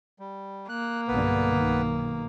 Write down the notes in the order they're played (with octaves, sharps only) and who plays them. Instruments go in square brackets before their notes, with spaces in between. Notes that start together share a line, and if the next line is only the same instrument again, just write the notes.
[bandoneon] G3
[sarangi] A#3 [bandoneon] F#6
[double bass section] B1 G2 D3 [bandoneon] B3 B4
[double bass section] B1 D#3